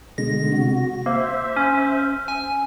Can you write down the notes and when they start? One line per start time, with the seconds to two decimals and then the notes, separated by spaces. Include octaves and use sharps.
0.18 B2 D3 G#3 A#6
0.52 C3 F#4
1.06 A#3 C5 E5
1.56 C#4
2.28 G#5